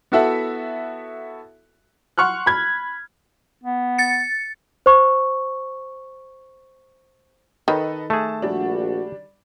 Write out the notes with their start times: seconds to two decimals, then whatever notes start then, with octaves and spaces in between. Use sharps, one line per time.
0.12 B3 E4 F#4 A4 E5 F#5
2.18 F#5 C6 C#6 F6 F#6
2.46 B5 G#6
3.64 B3
3.98 A6 C#7
4.86 C5 C#6
7.68 D#3 A4 B4 D#5
8.10 A3 G#4 A5
8.42 A#1 G3 D4 F#4